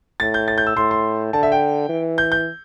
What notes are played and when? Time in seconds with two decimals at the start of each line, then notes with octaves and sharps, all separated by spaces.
0.20 A2 A6
0.34 G6
0.48 A6
0.58 G6
0.67 E6
0.77 A2 C6
0.91 C6
1.33 D3 A5
1.43 E5
1.52 G5
1.89 E3
2.18 G6
2.32 G6